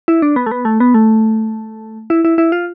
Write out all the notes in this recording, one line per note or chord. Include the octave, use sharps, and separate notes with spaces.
E4
D4
B3
A3
B3
A3
B3
A3
E4
E4
E4
F4